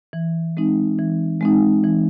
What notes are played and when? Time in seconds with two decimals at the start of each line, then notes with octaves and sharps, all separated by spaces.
0.13 E3
0.57 G#3 C4 D#4
0.99 E3
1.41 G#3 C4 D#4
1.84 E3